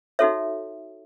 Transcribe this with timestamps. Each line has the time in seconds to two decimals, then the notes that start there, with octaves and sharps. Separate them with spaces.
0.19 D#4 F#4 A4 C#5 E5